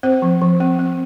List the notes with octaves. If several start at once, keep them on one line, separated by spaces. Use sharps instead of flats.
C4 C5
F3
F3
C4
C4